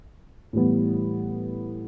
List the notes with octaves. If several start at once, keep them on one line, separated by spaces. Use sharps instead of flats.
A2 E3 G3 B3